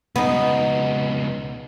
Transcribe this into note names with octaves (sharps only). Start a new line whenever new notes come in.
C#2 B2 B3 D#4